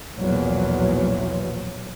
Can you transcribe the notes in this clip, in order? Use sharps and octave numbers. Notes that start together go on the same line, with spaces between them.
B1 E2 A#2 F3 F#3